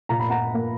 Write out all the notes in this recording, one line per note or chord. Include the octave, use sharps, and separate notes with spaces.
A#2 A#5
B5
F#5 A#5
A#3